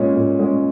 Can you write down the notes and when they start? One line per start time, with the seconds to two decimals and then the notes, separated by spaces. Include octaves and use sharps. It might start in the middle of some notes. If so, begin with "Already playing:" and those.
Already playing: A#2 G#3 C#4
0.16 A#2
0.39 G#3 C#4